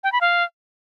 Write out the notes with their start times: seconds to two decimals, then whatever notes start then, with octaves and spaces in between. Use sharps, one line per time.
0.04 G5
0.12 B5
0.21 F5